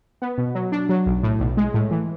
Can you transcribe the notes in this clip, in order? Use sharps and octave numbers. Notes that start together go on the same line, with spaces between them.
B3
B2
F#3
D4
F#3
B1
A2
B1
G#3
A2
E3